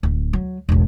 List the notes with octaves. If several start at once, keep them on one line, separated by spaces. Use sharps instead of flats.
D1
F#3
E1 A1